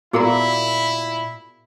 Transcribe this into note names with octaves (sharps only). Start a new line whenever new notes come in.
A#2 B3 E4 F#4 G#4 A#4 F5 A#5